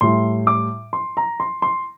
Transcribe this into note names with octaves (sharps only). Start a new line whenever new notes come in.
A2 G3 C6
D6
C6
A#5
C6
C6